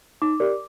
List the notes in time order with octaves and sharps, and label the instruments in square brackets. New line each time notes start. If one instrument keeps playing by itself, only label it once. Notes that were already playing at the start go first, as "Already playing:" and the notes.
[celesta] D#4 D6
G4 A#4 D5